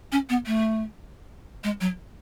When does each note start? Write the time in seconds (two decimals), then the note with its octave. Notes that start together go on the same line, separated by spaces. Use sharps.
0.12 C#4
0.29 B3
0.46 A3
1.64 G#3
1.81 F#3